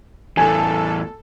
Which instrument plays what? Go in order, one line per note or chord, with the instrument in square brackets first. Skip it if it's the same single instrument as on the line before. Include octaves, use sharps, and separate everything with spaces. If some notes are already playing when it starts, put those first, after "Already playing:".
[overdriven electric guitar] E2 A2 [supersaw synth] A4 [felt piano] G#5